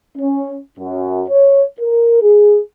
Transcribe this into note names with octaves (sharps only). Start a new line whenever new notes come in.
C#4
F#2
C#5
A#4
G#4